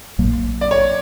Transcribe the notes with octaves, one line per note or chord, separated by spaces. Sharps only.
A#1 A#2 F#3 A#3
D5
C#5